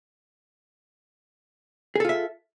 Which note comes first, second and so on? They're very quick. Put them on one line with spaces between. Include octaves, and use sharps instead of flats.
G#4 A4 F4 E5